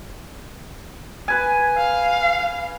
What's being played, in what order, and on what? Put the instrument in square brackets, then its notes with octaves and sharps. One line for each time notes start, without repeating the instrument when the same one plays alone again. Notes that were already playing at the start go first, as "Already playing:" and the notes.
[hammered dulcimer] B4 G#5
[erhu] F5